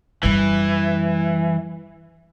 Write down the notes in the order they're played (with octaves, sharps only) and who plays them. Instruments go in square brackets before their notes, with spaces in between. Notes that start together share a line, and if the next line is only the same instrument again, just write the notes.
[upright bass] F#2 G3 [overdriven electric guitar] E3